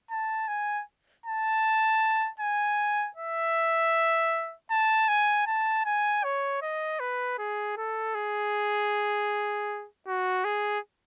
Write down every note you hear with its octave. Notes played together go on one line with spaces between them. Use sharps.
A5
G#5
A5
G#5
E5
A5
G#5
A5
G#5
C#5
D#5
B4
G#4
A4
G#4
F#4
G#4